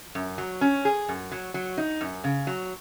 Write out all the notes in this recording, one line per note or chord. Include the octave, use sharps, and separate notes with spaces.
F#2
F#3
C#4
G#4
F#2
F#3
F#3
D#4
F#2
C#3
F#3